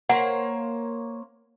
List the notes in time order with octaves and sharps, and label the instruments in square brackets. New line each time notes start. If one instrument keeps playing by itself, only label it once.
[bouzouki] A#3 C5 C#5 [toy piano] F#5